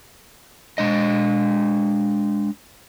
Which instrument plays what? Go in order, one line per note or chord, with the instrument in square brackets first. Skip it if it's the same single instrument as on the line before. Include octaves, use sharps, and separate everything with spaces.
[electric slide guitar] G#3 D4 D#5